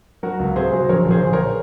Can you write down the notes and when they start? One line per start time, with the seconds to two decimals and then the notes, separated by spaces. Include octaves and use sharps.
0.23 F#3 F#4 A#4
0.40 C#2
0.56 C3 G#4 C5
0.73 F#3
0.89 A#1 A#4 C#5
1.05 A#1
1.11 G#4 C5
1.22 A#1
1.33 A#4 C#5